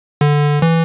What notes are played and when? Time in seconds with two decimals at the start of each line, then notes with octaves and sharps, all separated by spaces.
0.21 D3
0.62 E3